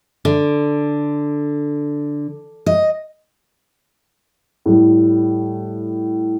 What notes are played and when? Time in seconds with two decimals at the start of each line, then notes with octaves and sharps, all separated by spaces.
0.25 D3
2.66 D#5
4.66 A2 G3